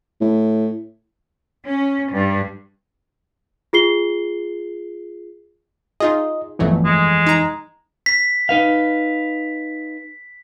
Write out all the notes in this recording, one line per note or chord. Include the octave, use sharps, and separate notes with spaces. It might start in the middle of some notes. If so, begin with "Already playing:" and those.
A2
C#4
G2
F4 G#4 C7 G7
D#4 F4 G#4 D#5
G1 F2 E3 F#3 A3
G#3
D#4 A#5
B6
D#4 B4 F5